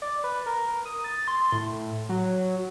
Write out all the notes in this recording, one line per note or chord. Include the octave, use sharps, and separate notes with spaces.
D5
B4
A#4
D#6
A6
C6
A2
F#3